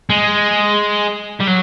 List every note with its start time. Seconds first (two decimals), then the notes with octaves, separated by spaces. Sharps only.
0.10 G#3
1.40 G3
1.47 F#3